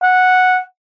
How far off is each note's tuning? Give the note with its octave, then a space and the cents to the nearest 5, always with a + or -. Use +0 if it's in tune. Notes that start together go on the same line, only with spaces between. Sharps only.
F#5 -5